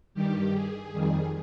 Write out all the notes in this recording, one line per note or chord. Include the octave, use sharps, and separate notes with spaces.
G2 D#3 G3 G4
G#4
F2 D#3 G3